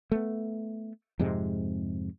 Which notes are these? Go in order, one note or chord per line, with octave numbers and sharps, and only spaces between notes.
A3 B3
F2 G#2 C3 G#3